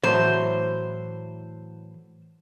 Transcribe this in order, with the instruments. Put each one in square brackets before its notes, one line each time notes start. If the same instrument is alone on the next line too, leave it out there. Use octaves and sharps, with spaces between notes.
[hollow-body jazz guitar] A2 E3 F#3 [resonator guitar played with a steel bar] C5